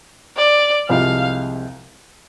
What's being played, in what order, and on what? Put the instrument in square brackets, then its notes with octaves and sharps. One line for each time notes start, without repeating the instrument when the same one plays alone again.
[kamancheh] D5
[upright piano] C2 C3 F3 G#3 [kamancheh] F5